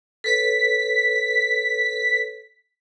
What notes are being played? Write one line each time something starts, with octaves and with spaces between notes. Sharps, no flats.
A4 B4 C#5 B6